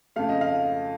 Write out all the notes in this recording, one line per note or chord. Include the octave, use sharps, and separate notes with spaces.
F2 C#3 A3 F5
D#5
F5